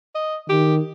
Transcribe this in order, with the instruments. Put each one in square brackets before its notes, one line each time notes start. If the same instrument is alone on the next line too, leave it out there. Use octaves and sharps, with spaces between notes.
[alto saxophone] D#5
[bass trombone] D#3 [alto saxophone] G4